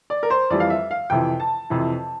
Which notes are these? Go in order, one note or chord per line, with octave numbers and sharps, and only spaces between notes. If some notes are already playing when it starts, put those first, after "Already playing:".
D5
A#4
C5
F2 E3 G3 D5
F5
E5
F5
F2 C3 E3 G5
A5
F2 C3 E3